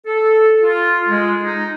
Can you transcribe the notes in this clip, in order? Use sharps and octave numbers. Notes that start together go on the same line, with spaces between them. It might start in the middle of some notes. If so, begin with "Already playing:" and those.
A4
F4
G#3
D#4